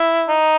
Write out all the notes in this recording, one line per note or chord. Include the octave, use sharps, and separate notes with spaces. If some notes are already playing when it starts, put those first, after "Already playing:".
Already playing: E4
D#4